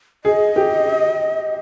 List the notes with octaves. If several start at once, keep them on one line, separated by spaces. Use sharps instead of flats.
G#4 D#5
G4